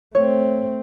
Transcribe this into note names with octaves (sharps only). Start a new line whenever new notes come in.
A3 C4 C#5